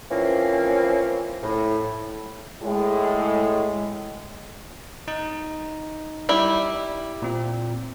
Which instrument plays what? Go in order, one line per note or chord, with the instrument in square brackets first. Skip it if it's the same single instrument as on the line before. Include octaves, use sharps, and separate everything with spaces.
[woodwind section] E3 F3 A#3 C4 C#4
A2
[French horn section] A2 G#3
[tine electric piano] D#4
[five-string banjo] G3 E4
[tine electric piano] A#2 C4